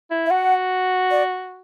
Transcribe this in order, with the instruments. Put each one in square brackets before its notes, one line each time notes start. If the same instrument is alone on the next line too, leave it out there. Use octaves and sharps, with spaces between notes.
[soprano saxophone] E4
[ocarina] E5
[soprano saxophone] F#4 [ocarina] F#5
[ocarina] D5